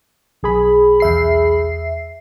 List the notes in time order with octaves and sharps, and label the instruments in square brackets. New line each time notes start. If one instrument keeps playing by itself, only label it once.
[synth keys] B1 G#4 B5
[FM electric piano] E2 E5 C7